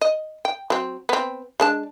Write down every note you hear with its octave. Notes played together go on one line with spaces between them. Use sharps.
D#5
G5
F#3 C4
B3 C4
G#3 D4 A5